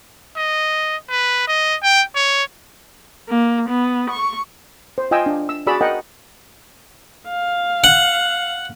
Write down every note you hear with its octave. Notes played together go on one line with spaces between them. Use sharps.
D#5
B4
D#5
G5
C#5
A#3
B3
C#6
C5
F4 D#5 G5 G#5 E6
D4
E6
F#4 G#4 D5 B5 E6
A#4 D#5 F#5 G5
F5
F#5